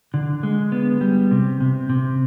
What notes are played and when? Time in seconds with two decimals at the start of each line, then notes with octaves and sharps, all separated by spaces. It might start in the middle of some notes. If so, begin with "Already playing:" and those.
0.14 D3
0.43 G#3
0.72 B3
1.01 G3
1.31 C3
1.60 C3
1.90 C3